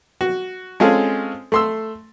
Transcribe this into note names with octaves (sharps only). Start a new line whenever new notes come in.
F#4
G#3 C4 C#4 F4 G#4 A4
A3 C6 E6